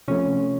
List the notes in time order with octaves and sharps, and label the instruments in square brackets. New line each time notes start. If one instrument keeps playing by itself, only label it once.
[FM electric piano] C3 F3 A3 [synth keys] C#4